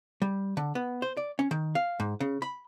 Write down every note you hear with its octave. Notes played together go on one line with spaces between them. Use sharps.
G3
D3
B3
C5
D5
C#4
D#3
F5
G#2
C#3
B5